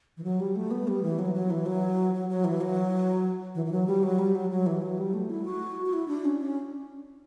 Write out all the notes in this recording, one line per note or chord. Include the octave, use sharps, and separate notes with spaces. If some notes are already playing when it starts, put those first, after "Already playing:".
E3
F#3
G3
A3
B3
G3
E3
F#3
F#3
E3
F#3
F#3
F#3
E3
F#3
E3
E3
F#3
G3
F#3
G3
F#3
F#3
E3
F#3
G3
A3
E4
F#4
F#4
E4
D4
C#4
C#4